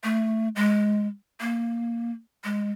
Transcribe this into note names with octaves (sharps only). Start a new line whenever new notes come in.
A3
G#3
A#3
G#3